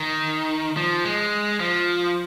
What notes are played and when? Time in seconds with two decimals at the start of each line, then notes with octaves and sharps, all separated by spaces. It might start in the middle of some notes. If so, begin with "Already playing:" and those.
Already playing: D#3
0.77 F3
1.05 G#3
1.60 F3